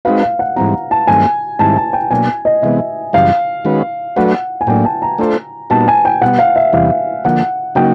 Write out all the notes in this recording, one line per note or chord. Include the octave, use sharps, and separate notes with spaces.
G#3 C4 D#4 F#4 B4 F5
F5
F#5
G#2 E3 G3 C4 A#5
A5
G2 D#3 F#3 A3 C4 G#5
G#2 D#3 G3 C4 E4 A5
A5
G5
B2 F#3 A#3 D4 G#5
D#5
C3 E3 G#3 B3 E5
F#2 C#3 E3 G3 F5
D#3 G#3 C#4 F#4 B4
F#3 A3 D4 F#4 B4 F#5
G#5
A2 F#3 A#3 D4 G5
A5
A#5
A3 D4 F4 A4 C5
A#2 G3 B3 D#4 F#4 A5
G#5
G5
B2 G3 B3 F#5
F5
E5
E2 C3 E3 G3 F5
D3 F3 A#3 F#5
C#3 F#3 A#3 D#4 F#4 G5